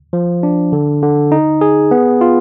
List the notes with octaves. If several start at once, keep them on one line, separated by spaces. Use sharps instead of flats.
F3
D4
D3
D3
D#4
G#4
B3
F4